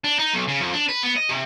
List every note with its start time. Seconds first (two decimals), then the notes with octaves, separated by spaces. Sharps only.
0.04 D4
0.19 D#4
0.33 B1
0.48 C#3
0.60 F2
0.73 D4
0.89 B4
1.04 B3
1.17 D#5
1.29 C3